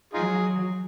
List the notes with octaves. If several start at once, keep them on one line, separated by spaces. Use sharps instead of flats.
F#3 D#4 F4 G#4